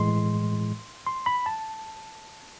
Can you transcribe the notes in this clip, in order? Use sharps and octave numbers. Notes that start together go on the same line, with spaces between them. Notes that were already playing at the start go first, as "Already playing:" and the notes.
Already playing: A2 E3 G#3 C6
C6
B5
A5